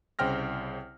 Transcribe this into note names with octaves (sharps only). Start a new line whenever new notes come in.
C2 C#3 C5 G5 F6 A#6